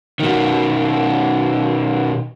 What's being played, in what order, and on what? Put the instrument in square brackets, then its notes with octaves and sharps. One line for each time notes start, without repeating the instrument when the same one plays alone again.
[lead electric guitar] B2 D#3